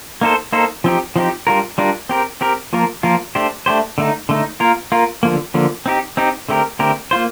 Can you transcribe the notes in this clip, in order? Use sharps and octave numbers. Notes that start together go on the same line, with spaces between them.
A#3 D#4 A4 C5
A#3 D#4 A4 C5
F3 C4 D#4 G4
F3 C4 D#4 G4
G3 D4 F4 A#4
G3 D4 F4 A#4
C4 G4 A#4
C4 G4 A#4
F3 A#3 F4 A#4
F3 A#3 F4 A#4
A3 D4 G4 C5
A3 D4 G4 C5
D3 A3 D#4
D3 A3 D#4
A#3 F4 A#4
A#3 F4 A#4
D3 F3 A#3
D3 F3 A#3
C4 D#4 G4
C4 D#4 G4
D3 A3 C4 G4 A#4
D3 A3 C4 G4 A#4
A#3 F4 C5